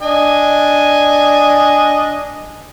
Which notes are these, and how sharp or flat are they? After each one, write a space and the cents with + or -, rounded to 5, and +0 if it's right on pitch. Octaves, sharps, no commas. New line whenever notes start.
D4 +0 D#5 +0 G#5 +0